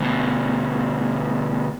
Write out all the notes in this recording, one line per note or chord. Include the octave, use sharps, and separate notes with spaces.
D2 B2